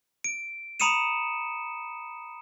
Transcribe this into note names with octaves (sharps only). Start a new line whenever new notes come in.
D7
A#5 B5 D#6 C#7 D#7 E7